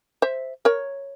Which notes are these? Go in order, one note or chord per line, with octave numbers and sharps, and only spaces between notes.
C5 E5
A#4 C#5